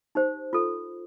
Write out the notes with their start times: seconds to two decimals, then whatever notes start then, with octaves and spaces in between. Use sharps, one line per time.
0.15 D#4 G4 C5
0.53 F4 A4